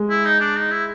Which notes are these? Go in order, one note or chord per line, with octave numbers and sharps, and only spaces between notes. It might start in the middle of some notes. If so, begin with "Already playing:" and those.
Already playing: G#3
E4
D#4
D4
D#4
E4